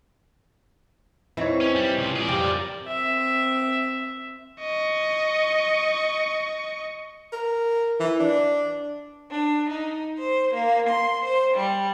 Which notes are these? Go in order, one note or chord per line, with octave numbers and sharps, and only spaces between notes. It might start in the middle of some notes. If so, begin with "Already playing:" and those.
E2 E3 C4 D#4 C#5
C#4
G3
C#2 C3
G#4 D5
F2 G3 G4 A#4 D5
C4 E5
D#5 C#6
A#4
E3
D4
D4
D#4
C5
A#3
C6
C5
G3